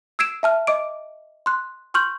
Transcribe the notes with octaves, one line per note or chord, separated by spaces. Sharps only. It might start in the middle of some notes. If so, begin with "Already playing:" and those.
E6 G#6 C7 D7 E7
E5 A5 F6
D#5 D6 D7
C6 F#6
C6 C#6 F6 G6 F#7